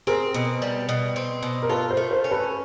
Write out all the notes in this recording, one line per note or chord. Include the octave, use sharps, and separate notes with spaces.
C4 G#4 A#4
B2
G3
B2
C4
B2
A#4
F4 A4 B4
A#4 C5
A3
A#4 C5
C#4
A4 B4